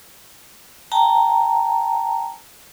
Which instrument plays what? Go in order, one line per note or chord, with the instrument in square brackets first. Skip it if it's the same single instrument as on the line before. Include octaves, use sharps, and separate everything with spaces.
[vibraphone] G5 A5 A#5